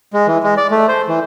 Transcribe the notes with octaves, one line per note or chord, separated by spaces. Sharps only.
G#3
E3
G#3
D5
A3
C5
E3